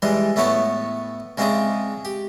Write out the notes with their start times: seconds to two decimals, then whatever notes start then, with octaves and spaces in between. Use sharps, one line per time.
0.02 E3 G3 G#3 D4
0.36 A2 A3 B3 E4 C#5 A5
1.38 C#3 G#3 C4 D4 E4 G#4
2.05 G4